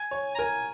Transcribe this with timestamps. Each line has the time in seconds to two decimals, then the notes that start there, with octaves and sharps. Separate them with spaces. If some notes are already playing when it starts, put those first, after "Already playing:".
Already playing: G#5
0.11 C#5
0.35 A#5
0.39 A#4 G#5